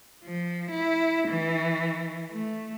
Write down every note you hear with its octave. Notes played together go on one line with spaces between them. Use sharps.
F3
E4
E3
A3